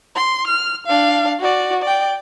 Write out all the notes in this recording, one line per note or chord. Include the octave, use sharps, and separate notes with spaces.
C6
F6
D4 F5
F#4 D5
D5 G5